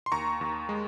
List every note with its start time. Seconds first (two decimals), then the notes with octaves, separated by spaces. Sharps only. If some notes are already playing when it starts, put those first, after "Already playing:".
0.06 C6
0.12 D#2 A#5 C#6
0.41 D#2
0.69 G#3